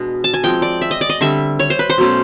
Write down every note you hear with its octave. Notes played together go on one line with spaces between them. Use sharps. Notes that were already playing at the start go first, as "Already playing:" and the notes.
Already playing: B2 G#3 B3 D4
A5
G#5
F3 G#3 C4 G5
D5
E5
D#5
D5
D#5
D3 G3 C4 E5
C#5
C5
B4
C5
B2 F#3 A3 C#4